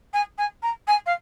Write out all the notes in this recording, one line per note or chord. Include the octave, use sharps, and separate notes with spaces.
G#5
G#5
A#5
G#5
F5